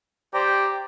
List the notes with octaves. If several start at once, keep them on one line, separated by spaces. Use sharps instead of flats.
G4 C5 D5 A#5